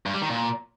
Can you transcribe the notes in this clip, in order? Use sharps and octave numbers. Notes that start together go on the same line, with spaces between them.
G2
G3
D#3
A#2